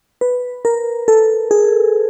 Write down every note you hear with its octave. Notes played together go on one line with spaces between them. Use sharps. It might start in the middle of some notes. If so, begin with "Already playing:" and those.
B4
A#4
A4
G#4